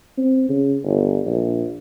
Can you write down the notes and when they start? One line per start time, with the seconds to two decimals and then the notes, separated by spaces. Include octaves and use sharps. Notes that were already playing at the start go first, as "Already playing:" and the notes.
0.18 C4
0.49 C#3
0.83 G1
1.26 A#1